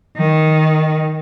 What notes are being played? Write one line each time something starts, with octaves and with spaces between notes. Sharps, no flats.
D#3